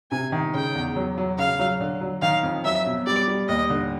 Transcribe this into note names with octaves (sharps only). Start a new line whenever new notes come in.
C3 G#5
D#3
C#3 G5
E2
F#3
F#3
C#3 F5
F#3
D3
F#3
D#3 F5
F2
F#3 E5
B2
G3 D5
G3
D#2 D#5
D3